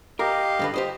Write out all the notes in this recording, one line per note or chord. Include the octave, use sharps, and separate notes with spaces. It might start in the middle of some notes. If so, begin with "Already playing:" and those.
G4 A#4 D#5 F5
G2 D3 B4
G4 C5 D#5